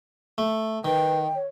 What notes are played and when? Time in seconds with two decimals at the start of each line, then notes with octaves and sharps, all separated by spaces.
0.38 A3
0.85 D#3 B4 G5
1.35 C#5